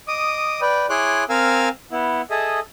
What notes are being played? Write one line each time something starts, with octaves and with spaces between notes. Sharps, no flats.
D#5 D6 D#6
B4 D5 G5
E4 G#4 C#5 C6 D6 F#6
C4 A#4 F5 G#5 E6 F6
B3 E4
G#4 A4 D#5 E5